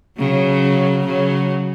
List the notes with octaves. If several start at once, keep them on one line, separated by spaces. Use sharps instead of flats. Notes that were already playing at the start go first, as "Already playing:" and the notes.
C#3 F#3
C#3 F#3